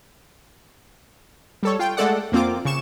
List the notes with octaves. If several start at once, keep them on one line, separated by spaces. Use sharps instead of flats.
G3 A4 C#5
F4 G5
G#3 A3 A4 D5 F#5
F2 A#3 C4 F4 D6
C#3 C#6 E7